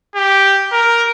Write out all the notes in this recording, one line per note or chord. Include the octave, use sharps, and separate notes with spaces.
G4
A#4